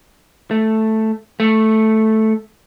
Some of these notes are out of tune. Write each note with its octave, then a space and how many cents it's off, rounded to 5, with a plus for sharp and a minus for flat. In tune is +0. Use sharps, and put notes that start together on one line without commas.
A3 +0
A3 -5